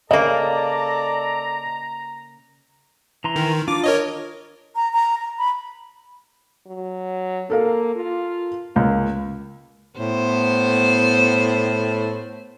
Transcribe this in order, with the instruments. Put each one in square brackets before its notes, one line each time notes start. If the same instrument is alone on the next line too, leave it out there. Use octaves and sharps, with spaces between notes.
[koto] C#3 A#3 [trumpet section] A4 D5 [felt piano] D#5 [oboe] A#5
[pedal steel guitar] E3 A#5 C6
[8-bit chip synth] D#3
[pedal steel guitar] D4 F4 [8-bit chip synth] D6
[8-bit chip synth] A#4 C#5 D#5
[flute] A#5
A#5
A#5
B5
[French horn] F#3
[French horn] A#3 [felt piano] A4 A#4 F5
[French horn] F4
[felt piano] C#2 [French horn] A#3
[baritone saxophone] A2 [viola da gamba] B3 C5